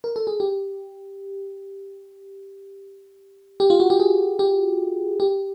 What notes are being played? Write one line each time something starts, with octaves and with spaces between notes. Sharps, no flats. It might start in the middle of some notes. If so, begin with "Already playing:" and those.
A#4
A4
G#4
G4
G4
F4
F#4
G4
G#4
G4
G4